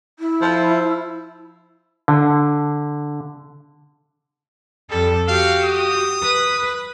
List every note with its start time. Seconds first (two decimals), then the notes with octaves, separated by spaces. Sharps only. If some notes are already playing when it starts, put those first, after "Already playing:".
0.19 E4
0.42 F3
2.08 D3
4.90 F2 G3 A4
5.28 F#4 G4 F5
5.64 D#6
6.22 B4